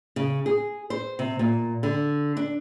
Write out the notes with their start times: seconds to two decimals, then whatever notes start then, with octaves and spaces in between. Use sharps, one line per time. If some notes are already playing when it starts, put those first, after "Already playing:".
0.16 C#3
0.46 G#4
0.90 C5
1.19 C3
1.39 A#2
1.83 D3
2.37 D4